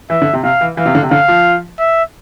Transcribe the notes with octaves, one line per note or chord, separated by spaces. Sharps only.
E3 E5
D3
C3
C3 F5
E3
E3 F5
C3
D3
C3
D3 F5
F3
E5